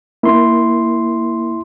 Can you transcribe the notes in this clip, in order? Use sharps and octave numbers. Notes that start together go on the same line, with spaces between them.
A#3 E4 C6